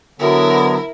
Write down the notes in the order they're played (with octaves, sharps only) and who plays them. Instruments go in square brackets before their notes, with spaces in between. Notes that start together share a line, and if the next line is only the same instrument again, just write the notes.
[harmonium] D3 F#3 B3 [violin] E4 A#4